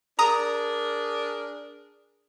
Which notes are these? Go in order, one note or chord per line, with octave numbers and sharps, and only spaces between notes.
D4 G#4 A#4 A#5 D#6